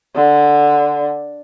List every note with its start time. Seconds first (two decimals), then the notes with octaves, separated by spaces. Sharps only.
0.15 D3